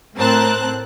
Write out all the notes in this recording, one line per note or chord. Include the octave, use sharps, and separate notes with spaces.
A2 C4 A#4 A5 F#6